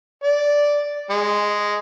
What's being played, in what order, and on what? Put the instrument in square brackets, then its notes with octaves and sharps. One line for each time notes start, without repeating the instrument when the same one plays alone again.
[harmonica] D5
G#3